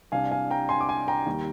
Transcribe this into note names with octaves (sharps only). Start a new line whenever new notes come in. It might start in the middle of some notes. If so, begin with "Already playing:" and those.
C2 C3 G3 D4 F5 G#5
F5 G#5
G5 A#5
G#5 C6
D6
G#5 C6
G5 A#5
D#2 D#3 G3